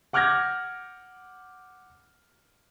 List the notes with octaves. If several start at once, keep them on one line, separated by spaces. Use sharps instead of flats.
F#5 D6 F6 G6 G#6 A#6